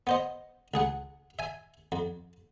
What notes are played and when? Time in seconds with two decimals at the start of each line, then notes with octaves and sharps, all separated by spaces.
0.07 B3 C5 D#5
0.74 C#2 G#4 F#5
1.39 E5 G#5
1.92 F2